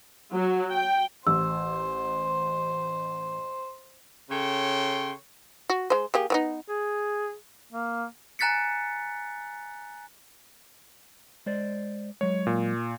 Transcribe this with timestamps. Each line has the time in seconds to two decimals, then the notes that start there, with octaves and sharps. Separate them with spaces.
0.32 F#3
0.73 G5
1.27 A1 C5 E6
4.31 C#3 A4 C#5 G5 C6
5.69 F#4
5.90 G#3 C5
6.14 A#3 G4 G#4
6.30 F3 B3 D#4
6.68 G#4
7.72 A#3
8.39 G#5 A#5 F#6 A6 B6 C#7
11.46 G#3 C5 D5
12.21 F#3 G#3 C#5
12.47 A#2